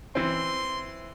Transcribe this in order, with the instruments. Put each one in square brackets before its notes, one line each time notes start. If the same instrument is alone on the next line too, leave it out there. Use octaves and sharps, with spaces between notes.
[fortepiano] E3 C4 [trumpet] C6